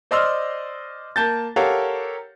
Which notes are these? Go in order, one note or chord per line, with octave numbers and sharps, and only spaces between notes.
C5 D5 D#5 C6 E6 F6
A#3 A5 G6 A6
G4 A4 A#4 C#5 F5 F#5